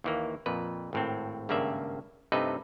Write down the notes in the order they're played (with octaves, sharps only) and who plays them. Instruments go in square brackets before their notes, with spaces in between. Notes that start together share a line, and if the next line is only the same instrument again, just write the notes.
[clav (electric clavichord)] D#2 E3 A#3
F2 A#2 B4
G#1 A2 C4
G#1 G2 C#3 A#3 D5 E5
G2 C3 A3 D#4 B4 D#5